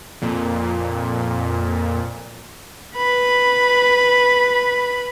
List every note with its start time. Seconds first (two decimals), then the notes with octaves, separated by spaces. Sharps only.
0.22 F2 A#2
2.95 B4 B5